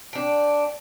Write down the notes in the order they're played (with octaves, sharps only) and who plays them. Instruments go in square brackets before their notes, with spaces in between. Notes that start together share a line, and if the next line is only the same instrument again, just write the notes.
[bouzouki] D4 G5